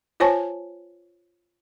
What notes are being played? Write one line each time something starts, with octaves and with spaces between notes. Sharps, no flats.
F4 C5 C#5 G#5 A5 C#6